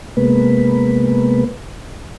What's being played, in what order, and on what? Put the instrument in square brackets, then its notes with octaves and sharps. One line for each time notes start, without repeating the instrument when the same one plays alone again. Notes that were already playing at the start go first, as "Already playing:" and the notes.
[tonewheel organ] C3 G#3 A#3 B3 B4